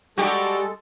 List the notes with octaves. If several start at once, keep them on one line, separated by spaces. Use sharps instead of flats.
G3 G#3 F#4 G4 A4